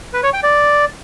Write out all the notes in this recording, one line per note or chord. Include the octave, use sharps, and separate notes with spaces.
B4
C#5
G5
D5